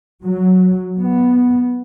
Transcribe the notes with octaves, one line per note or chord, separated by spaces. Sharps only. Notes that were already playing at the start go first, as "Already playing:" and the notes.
F#3
B3